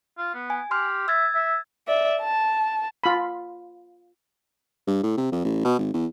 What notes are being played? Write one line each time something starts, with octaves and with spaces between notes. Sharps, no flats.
F4
B3
G#5
G4 C6 F6
E5 E6 G#6 A6
E5
D5 E5
A5
F4 B5
G2
A2
C3
F2
A1
B2
G#1
E2